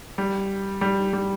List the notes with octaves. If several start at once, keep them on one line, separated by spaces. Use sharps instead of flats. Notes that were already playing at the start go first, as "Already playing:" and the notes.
G3
G3
G3